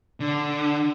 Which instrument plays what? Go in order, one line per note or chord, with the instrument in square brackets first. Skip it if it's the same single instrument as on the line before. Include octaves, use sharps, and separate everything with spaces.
[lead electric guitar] D3